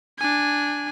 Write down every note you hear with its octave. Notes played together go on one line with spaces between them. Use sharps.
D4 G#5